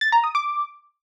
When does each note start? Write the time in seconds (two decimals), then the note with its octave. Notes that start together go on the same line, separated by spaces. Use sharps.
0.01 A6
0.12 A#5
0.24 D#6
0.35 D6